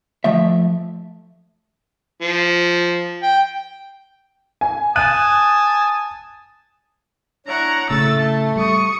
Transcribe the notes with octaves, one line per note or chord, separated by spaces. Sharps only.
F3 A3 E5
F3
G5
G#5
G#5 A5 D#6 F#6 D#7
D4 E4 C#5 F#5 A#5
A2 C#3 A3 E6 A6
A5
G3 C#6 D#6